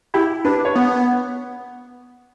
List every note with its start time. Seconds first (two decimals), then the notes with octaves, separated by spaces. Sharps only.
0.14 E4 G4
0.45 D4 B4
0.65 C#5
0.75 B3 B4